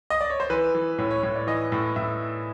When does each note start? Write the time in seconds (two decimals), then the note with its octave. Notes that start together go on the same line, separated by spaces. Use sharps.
0.10 D#5
0.21 D5
0.30 C#5
0.40 C5
0.50 E3 B4
0.75 E3
0.98 A2 C#5
1.11 C#5
1.23 A2 C#5
1.36 D5
1.47 E3 D#5
1.72 A2
1.96 A2 E5